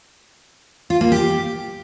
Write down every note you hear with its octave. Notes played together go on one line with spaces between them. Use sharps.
F4
A#3
G4